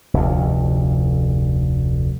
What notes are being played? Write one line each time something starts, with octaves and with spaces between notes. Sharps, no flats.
F1 D2